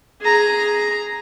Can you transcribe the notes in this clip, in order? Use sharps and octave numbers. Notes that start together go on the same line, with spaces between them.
G#4 A#5